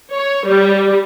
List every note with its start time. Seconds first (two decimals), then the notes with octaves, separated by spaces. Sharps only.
0.12 C#5
0.47 G3